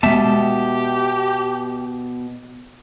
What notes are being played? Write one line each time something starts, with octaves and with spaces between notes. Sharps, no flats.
B2 G#3 B3 G4 E5 A5